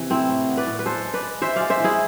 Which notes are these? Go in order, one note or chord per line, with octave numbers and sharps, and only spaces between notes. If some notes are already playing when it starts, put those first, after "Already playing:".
Already playing: C3 E3
A3 C4 E4
A2
B3
B4 D5
A2
B4
G#3 A4 C5
G#3
B4 D5
G#3
E3 C5 E5
G#3 D5 F5
C5 E5
E3 E4 G#4